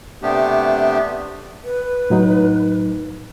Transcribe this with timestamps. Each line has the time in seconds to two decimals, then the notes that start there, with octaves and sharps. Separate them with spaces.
0.22 C3 A3 B3 D4 G4
1.65 B4
2.10 A2 F#3 D#4